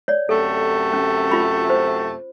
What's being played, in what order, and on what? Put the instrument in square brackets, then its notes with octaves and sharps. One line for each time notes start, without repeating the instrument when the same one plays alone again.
[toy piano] C#5 D5
[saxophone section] F#2 C3 A3 [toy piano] A4
[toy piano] C#4
F4 B5
C5